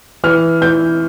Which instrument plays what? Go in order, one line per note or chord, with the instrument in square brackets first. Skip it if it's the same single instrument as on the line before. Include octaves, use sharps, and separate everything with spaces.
[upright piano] E3 F6
E3 G6